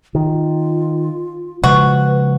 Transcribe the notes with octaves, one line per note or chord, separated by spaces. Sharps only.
D#3 F4
C#3 F3 G#3 F#4 B4